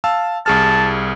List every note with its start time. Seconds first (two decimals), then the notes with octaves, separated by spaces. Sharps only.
0.04 F5 A5 E6
0.46 C2 G#4 A5 F6